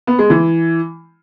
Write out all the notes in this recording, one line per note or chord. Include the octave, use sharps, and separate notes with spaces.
B3
G#3
E3